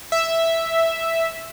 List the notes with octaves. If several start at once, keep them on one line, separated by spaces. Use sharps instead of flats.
E5